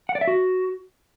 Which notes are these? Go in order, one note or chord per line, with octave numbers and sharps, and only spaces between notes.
F#5
D5
E5
F#4